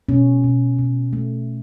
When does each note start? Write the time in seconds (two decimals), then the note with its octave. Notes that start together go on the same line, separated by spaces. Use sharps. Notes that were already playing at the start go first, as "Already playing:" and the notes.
0.09 B2 C#4
0.44 B2
0.79 B2
1.13 A3